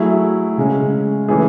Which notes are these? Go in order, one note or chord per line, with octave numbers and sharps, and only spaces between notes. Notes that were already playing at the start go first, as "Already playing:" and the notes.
Already playing: F#3 A3 E4 G#4
C#3 G#3 C#4
E3 A3 C#4 E4 G#4